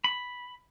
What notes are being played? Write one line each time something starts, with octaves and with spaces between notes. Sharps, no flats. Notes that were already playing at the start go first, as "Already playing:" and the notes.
B5